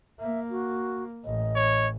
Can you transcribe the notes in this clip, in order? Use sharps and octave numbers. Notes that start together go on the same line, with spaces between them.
A#3 E5
F#4
A1 D#5
C#5